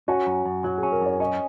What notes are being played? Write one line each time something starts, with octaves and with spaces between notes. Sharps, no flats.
C#4 F#4
F#2
F#2
F#3 F#4
G#4
C#4
A#4
F#2 C#5
C#4 D#5